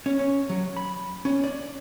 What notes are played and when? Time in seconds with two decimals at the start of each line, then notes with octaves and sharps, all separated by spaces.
0.06 C#4
0.19 C#4
0.50 F#3
0.77 B5
1.25 C#4
1.44 D5